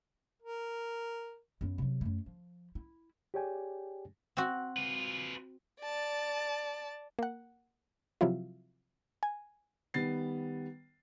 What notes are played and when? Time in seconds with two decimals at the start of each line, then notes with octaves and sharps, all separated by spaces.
0.42 A#4
1.61 F#2 B3
1.78 C3 F#3
2.01 F#2 A3
2.26 F3
2.75 E4
3.34 G4 G#4 C#5 D5 G5 G#5
4.37 C4 F#4
4.77 F4 B4
5.81 D5 A5
7.19 A#3 F#5
8.21 C3 F3 F#3 E4 F4
9.23 G#5
9.94 D#3 G3 B3 A6 C7